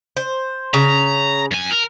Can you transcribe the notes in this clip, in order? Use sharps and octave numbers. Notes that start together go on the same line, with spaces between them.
C5
C#3 A#5
F#2 G#5
A#4